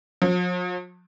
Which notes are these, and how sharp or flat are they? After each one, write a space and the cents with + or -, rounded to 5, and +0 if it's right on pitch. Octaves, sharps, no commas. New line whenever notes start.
F3 +45